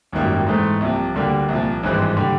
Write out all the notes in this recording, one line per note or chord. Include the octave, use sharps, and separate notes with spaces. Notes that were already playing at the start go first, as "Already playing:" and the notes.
G#1 F#2 D#3 G3 A#3
G#2 E3 A3 C4
C2 C3 F3
D2 D3 G3 A#3
C2 A#2 F3
G#1 G2 E3 G#3 C4
D3 G3